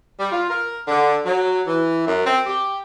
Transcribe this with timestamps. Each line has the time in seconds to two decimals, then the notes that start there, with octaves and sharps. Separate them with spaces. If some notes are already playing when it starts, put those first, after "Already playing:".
0.20 G3
0.32 F4
0.50 A#4
0.88 D3
1.26 F#3
1.67 E3
2.07 F#2
2.26 C4
2.46 G4